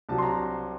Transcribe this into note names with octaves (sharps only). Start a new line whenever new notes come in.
C2 C3 F#3 A5
C6
A#5